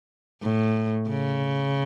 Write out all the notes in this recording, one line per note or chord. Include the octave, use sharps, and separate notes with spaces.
A2
C#3